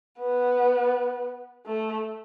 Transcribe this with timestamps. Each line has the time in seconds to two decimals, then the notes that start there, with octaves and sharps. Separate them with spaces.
0.19 B3
1.66 A3